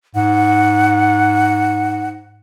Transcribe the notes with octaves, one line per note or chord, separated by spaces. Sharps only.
G#2 F#5